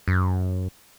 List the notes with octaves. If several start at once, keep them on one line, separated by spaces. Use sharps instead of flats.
F#2